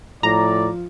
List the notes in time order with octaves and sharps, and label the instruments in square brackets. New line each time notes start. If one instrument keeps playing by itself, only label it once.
[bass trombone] A2 [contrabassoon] F3 [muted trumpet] D5 [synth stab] A#5